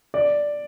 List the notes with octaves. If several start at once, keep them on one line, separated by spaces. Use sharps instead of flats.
D5